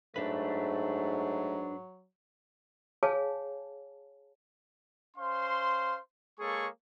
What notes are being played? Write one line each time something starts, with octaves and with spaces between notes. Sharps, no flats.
G#2 F#3 A3 D4 B4
G#4 C#5 F5 G#5 A5
C#4 C5 F5 C6
G#3 A#3 G#4 A4 C#5 C#6